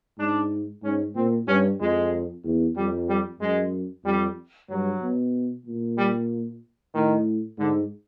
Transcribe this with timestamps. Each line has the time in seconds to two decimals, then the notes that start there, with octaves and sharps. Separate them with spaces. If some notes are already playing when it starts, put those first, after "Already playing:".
0.19 G#2 D4
0.83 G#2 C#4
1.16 A#2 C4
1.47 G2 C#4
1.80 F2 G#3
2.44 E2
2.76 F2 G3
3.09 G3
3.40 F#2 G#3
4.05 F2 G3
4.69 G2 F#3
5.02 B2
5.66 A#2
5.98 G3
6.94 A2 D#3
7.58 G#2 D3